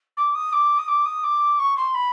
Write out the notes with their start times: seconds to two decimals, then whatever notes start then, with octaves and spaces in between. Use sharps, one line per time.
0.17 D6
0.35 D#6
0.52 D6
0.78 D#6
0.88 D6
1.05 D#6
1.23 D6
1.59 C#6
1.77 C6
1.94 B5